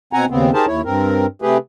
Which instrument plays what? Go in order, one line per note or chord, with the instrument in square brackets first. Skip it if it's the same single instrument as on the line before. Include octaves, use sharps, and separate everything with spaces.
[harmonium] B2 C4 F#5 G#5 A#5
D#2 C#3 B3 C4
D#4 G4 G#4 A#4 C5 A5
D#2 E4 C#5
G2 C4 A#4
C3 A3 G4 G#4 B4